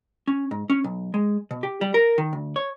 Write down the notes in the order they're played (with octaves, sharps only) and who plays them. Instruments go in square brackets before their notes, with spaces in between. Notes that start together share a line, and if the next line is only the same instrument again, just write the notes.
[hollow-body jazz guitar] C#4
G#2
C#4
B1
G#3
B2
G4
G3
A#4
D#3
D2
C#5